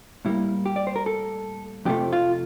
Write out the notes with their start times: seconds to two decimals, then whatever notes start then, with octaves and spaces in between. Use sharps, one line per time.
0.25 A2 G3 A#3 E4
0.66 G4
0.76 D5
0.87 C5
0.96 A#4
1.06 A4
1.85 F2 C3 F3 A3 G4
2.13 F4